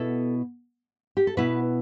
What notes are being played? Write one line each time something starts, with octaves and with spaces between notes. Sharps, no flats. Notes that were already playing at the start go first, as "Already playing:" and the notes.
Already playing: B2 B3 E4 A4
G4
A4
B2 B3 E4 B4